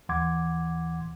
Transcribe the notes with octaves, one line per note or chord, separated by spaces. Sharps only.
D#2 E3 F#5 C6 D6 G#6